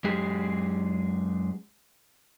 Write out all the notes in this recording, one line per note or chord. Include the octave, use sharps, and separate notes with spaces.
F#2 G#3 G4 G#4